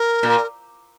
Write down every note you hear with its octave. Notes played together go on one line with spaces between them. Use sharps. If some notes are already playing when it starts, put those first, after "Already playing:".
Already playing: A#4
A#2